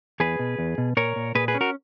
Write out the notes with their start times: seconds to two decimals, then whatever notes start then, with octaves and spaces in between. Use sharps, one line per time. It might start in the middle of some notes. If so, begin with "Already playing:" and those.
0.20 E2 G#4 B4
0.39 B2
0.59 E2
0.78 B2
0.97 A#2 A#4 C#5
1.16 A#2
1.35 A#2 G#4 B4
1.48 G#4 B4
1.55 C#4
1.61 F#4 A#4